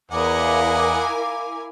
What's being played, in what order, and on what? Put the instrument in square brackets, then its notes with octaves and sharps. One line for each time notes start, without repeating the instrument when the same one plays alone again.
[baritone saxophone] E2 [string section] E4 A#4 G#5 [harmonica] D#5 F#5 [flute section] F5 D6